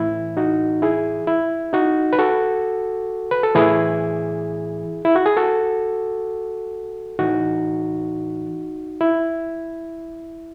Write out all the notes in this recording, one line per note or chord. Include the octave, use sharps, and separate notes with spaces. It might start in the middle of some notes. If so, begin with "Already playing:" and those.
Already playing: A2 E3 E4
D#4 F#4
E4 G#4
E4
D#4 F#4
B4
F#4 A4
B4
A4
A2 E3 E4 G#4
E4
F#4
G#4
F#4 A4
A2 E3 D#4 F#4
E4